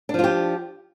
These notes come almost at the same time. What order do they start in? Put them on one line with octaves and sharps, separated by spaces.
D4 F3 F4 G4